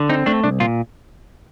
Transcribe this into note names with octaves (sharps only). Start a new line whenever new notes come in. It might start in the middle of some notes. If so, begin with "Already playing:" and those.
Already playing: D3
C4 D#4
A3 D4
C2 D4
A#2 F4